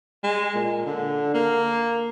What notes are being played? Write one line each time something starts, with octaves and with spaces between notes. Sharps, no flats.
G#3
A#2
D3
A#3